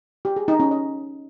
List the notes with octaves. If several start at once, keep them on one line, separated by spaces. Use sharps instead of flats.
G4
G#4
D#4
C#4
D#5